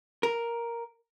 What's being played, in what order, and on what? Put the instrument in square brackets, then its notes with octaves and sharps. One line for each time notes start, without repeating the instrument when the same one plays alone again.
[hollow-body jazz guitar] A#4